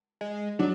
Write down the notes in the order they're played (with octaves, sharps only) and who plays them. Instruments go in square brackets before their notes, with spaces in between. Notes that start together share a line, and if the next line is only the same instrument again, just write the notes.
[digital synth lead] G#3
[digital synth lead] F#3 [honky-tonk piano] D4